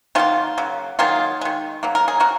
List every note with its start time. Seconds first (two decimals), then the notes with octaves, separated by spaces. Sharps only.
0.15 D#3 F#3 A#3 C#4 F4
0.58 C#3 F#3 A#3
0.99 D#3 F#3 A#3 F4 G#4
1.41 D#3 G#3
1.83 C#3 F#3 A#3
1.95 A#4
2.08 G#4
2.20 F#4 A#4